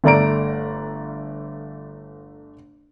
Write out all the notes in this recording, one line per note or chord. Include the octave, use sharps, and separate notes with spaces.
G1 A3 D5 A#5 D7